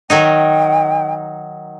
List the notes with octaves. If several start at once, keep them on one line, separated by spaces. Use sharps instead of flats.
D#3 F#3 D#4 G5